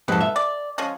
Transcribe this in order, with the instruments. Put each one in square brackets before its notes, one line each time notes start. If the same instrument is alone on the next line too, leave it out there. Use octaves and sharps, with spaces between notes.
[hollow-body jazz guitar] F2 G#2 C3 [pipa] A4 B4
[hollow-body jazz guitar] E5
[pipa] D5
F3 G#3 C#4